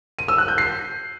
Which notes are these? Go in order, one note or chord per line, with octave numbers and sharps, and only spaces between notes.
D#7
E6
F#6
G6
C7